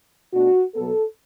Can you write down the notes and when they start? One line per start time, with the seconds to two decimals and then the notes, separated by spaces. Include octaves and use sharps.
0.33 B2 A3 D4 F#4
0.74 B2 F#3 B3 A4